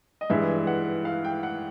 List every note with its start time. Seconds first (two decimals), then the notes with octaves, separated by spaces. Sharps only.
0.21 D#5
0.30 G2 E3 G#3 E5
0.67 F#5
1.05 F5
1.24 G5
1.43 F#5